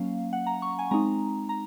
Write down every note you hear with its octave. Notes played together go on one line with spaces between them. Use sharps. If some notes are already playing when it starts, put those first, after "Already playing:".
Already playing: F#3 A#3 C#4 F5
F#5
A#5
C#6
G#5
G#3 C4 D#4 A#5
A#5